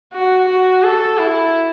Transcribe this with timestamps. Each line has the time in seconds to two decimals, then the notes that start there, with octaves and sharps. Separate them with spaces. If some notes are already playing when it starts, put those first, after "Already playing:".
0.13 F#4
0.49 F#4
0.83 A4
1.18 E4